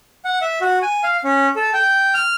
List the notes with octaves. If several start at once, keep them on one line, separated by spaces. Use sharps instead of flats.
F#5
E5
F#4
G#5
F5
C#4
A4
G5
F6